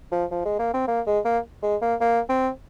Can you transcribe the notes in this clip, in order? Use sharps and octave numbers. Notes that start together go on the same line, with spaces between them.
F3
F3
G#3
A#3
C4
A#3
G#3
A#3
G#3
A#3
A#3
C4